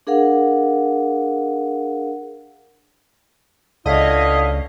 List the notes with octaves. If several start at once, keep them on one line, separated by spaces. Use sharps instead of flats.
D4 G#4 A#4 F5 F#5
C#2 D3 E4 C#5 D#5 F5